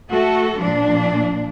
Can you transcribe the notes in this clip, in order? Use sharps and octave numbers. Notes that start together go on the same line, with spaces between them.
A3 F#4 A4
A#2 F3 D4